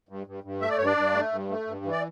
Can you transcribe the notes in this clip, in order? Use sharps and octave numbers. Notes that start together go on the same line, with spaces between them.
G2
G2
G2
A3 E5
D5
G2 C#5
D4 D5
G2
A3
G2
A3
G2
E3
D5